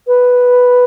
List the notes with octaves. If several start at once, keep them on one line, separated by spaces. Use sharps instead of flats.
B4